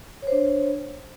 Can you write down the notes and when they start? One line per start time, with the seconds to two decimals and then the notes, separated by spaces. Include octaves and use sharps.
0.22 C#5
0.27 C5
0.32 D4